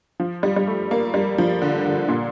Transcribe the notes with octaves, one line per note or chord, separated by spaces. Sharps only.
F3
G3
G3
A3
A#3
G3
F3
D3
D3
A#2